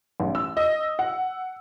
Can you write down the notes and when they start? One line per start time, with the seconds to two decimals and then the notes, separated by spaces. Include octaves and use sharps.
0.20 A1
0.35 E6
0.57 D#5
0.99 F#5